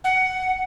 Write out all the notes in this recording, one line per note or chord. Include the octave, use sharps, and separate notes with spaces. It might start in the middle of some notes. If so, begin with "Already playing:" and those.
F#5